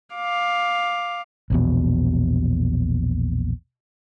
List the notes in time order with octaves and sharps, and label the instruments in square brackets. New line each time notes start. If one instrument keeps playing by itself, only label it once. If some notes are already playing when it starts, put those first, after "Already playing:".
[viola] F5 D6
[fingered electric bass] A#1 E2 B2